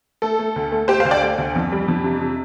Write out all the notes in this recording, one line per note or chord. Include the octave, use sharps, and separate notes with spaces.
A3 A4
A3
D2
A3
A3 G4 C5
D2 C5 F5
D5 G5
A3
D2
F2
G3
F2
C3
C3